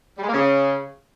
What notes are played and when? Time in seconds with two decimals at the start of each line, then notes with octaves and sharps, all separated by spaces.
0.18 G3
0.23 G#3
0.29 A#3
0.34 C#3